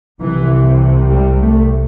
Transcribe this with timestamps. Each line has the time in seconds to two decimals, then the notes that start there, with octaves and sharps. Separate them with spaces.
0.20 C2 C3 E3
1.10 G3
1.41 A3